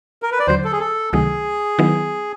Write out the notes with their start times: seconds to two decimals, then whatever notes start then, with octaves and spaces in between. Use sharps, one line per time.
0.22 A#4
0.32 B4
0.39 D5
0.47 D#2 D3 F#3 C5
0.65 A4
0.72 G#4
0.80 A4
1.13 C#2 C3 D#3 F#3 A3 G#4
1.79 D#3 F#3 B3 E4